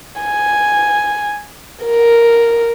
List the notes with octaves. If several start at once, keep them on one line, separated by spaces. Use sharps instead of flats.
G#5
A#4